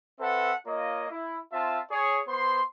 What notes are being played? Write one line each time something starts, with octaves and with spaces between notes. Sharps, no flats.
C4 A4 B4 E5 F#5
A#3 F4 C#5 D#5
E4
C4 F4 E5 A5
G#4 C#5
B3 C5 C6